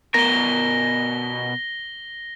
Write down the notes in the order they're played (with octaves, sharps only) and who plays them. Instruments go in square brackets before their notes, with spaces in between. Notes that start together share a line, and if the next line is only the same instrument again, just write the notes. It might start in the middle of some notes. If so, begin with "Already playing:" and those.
[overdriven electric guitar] B2 A#4 [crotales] A#6 G7